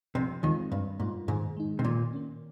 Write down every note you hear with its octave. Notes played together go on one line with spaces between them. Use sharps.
C2 C3 F3
D#2 D#3 G#3 C4 F4
G2 G3
G#2 A#3 F4
G#2 D#3
G#3 D#4
C3
A#2 D#3
A#3 C#4